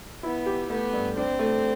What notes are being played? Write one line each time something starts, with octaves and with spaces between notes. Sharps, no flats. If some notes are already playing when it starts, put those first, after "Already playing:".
B3 E4
G4
A3 B3
G2
C4 D4
A3